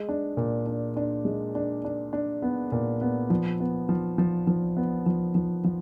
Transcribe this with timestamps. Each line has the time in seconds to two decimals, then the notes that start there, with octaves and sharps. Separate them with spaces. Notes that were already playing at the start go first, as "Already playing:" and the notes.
Already playing: G#3
0.09 D4
0.37 A#2
0.66 D4
0.97 D4
1.25 G#3
1.55 D4
1.85 D4
2.13 D4
2.42 B3
2.72 A#2
3.01 B3
3.30 F3
3.60 B3
3.89 F3
4.18 F3
4.47 F3
4.77 B3
5.06 F3
5.35 F3
5.64 F3